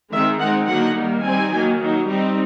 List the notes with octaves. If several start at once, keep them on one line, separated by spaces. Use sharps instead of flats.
D#3 G#3 C4 D#4 E5
G#3 C4 D#4 F#5
D3 F#3 A#3 D#4 F#5
D#3 G3 A#3
G3 C4 D#4 G#5
D#3 F#3 A#3
F#3 A#3 D#4
G3 C4 D#4